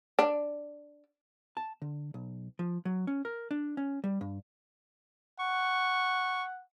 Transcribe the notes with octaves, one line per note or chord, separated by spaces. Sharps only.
D4
A5
D3
B1
F3
F#3
C#4
A#4
D4
C#4
G3
G2
F#5 C#6